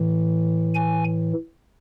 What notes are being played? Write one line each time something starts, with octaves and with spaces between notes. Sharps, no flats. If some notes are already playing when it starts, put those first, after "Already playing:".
Already playing: A2 E3
G#5